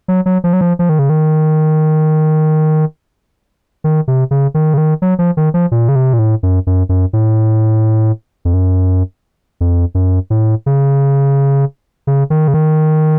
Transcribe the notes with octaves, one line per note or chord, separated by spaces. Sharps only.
F#3
F#3
F3
F#3
F3
F3
D#3
C#3
D#3
D#3
C3
C#3
D#3
C#3
D#3
F#3
F3
D#3
F3
A#2
C#3
C3
A#2
A2
F#2
F#2
F#2
A2
F2
F#2
F2
F#2
A2
C#3
C#3
D#3
C#3
D#3